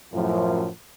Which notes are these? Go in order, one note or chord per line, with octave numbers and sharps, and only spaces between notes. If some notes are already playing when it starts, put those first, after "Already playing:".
F#2 A2 F3